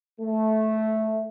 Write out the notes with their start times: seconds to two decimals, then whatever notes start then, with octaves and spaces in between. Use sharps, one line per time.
0.20 A3